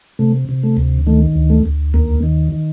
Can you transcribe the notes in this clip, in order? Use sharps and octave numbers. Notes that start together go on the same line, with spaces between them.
C3 A3
C3
A3
D2
D#3 A3
D2
A3
D2
D#2 A#3
D#3
D#3